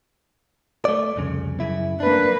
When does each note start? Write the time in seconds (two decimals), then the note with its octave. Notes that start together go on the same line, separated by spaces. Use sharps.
0.85 A3 D5
1.16 C2 F2 C#3
1.60 F#2 C#3 E4
2.00 A#3 D4 B4